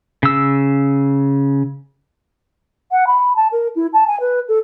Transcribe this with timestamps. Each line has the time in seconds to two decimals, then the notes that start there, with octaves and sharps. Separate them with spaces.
0.23 C#3 E6
2.91 F#5
3.07 B5
3.36 A5
3.52 A#4
3.75 E4
3.93 A5
4.07 G#5
4.20 B4
4.48 A4